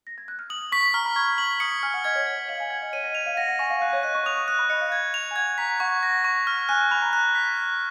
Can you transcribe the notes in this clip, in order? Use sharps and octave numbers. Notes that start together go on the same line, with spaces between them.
A#6
G#6
F#6
F6
D#6 F#7
C#6 B6
A#5 F6
B5
C#6 G#6
C#6
C#6 F#7
D#6 C#7
C#6
G#5 F6
F#5
D#5 G#6
C#5
C#5 G#6
D#5
F5 F#7
G#5
F#5 G#6
D#5
C#5 D#7
D#5
D#5 F7
F5
F#5 A#6
F#5
G#5 C#6
F5
F5 F#6
C#5
D#5 F#6
C#6
D#6 F7
D#6
D#6 F#6
B5
D#5 C#7
F5
G#6
F7
G#5
F#5 G#6
A#5 B6
F#5 C#6
A#6
C#6
F6
G#5 F#6
B5 F7
A#5
F#6
B6
F#6